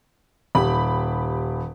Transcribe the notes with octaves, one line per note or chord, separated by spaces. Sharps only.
D#1 G4 B5